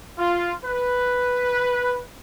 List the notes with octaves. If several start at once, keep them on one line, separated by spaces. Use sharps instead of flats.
F4
B4